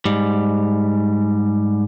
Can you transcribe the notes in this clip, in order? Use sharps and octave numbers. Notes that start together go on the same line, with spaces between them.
G#2 G3